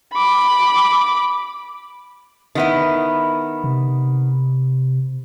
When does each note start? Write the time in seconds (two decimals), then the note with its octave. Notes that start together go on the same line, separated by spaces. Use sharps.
0.14 B5 D6
2.55 D#3 B3 E4
3.64 C3